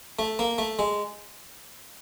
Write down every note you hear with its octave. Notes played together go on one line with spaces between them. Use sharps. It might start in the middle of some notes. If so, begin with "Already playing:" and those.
A3
A#3
A3
G#3